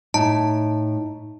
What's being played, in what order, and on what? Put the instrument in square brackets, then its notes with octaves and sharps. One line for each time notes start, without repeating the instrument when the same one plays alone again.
[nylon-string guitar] A2 [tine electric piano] D#4 [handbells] A5